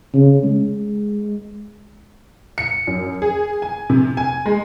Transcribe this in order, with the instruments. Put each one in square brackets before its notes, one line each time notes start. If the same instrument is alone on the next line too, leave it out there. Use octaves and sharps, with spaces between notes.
[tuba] C#3
G#3
[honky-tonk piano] C#7
F#2
G#4
G#5
C3
G#5
G#3